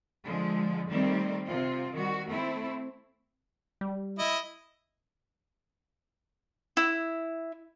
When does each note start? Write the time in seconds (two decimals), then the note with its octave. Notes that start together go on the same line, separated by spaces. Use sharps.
0.24 D3 F3 G#3
0.89 D#3 G3 A3 C4
1.46 C3 C4 F4
1.93 D#3 G3 F#4
2.27 A3 C4 E4
3.81 G3
4.19 E4 D#5
6.77 E4